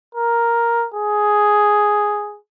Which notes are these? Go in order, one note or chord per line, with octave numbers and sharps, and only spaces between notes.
A#4
G#4